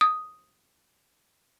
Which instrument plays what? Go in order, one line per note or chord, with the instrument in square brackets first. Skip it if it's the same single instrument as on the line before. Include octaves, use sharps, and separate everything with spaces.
[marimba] D#6